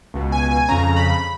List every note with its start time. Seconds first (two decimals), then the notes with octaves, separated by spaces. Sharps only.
0.14 C#2 B2
0.32 G#5
0.51 G#5
0.69 F2 C#3 A#5
0.97 B5